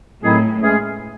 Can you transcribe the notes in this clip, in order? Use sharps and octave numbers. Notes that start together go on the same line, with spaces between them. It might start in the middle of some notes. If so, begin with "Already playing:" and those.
A2 D#3 F#3 C4 E4 G#4
E3 G#3 C#4 G#4